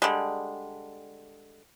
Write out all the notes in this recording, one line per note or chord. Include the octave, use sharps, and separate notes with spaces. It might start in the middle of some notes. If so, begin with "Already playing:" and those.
D3 G3 G#3